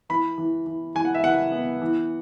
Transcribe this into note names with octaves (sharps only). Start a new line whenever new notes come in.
E3 B5
E3
E3
E3 G#5
F#5
E5
E3 F#5
B3
E3